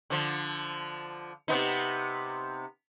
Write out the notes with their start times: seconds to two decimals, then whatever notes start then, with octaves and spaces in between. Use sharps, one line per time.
0.10 D3 F3
1.48 C3 B3 D#4